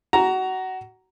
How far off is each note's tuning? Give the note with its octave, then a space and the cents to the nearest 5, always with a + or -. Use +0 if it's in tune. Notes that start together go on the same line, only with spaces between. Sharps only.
F#4 +20 A#5 +0